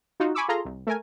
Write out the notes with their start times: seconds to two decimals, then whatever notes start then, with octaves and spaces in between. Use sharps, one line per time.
0.20 D#4 F4 F#4
0.35 G#5 B5 C#6 D6 E6
0.48 F4 G#4 A4 F5 A#5 C6
0.65 C2
0.87 A3 A#4 G#5